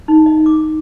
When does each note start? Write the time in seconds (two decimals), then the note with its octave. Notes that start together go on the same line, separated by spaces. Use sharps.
0.08 D#4
0.26 D#5
0.46 D6